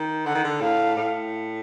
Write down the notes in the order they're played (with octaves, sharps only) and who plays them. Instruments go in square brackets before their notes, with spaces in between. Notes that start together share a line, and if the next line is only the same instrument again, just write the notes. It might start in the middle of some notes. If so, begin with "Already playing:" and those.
Already playing: [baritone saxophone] D#3
[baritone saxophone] D3 [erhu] F#5
[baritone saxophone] D#3
D3
[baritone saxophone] A2 [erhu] F5
[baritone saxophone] A2